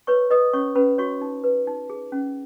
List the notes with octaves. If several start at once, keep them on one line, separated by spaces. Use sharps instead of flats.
B4 C#5 C#6
B4 D#5 D#6
C#4 C#5 C#6
C#4 B4 B5
F#4 C#5 C#6
D#4
B4
D#4
G#4
C#4